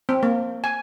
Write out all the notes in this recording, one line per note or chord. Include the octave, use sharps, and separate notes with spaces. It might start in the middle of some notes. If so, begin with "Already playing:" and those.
C4
A#3
G#5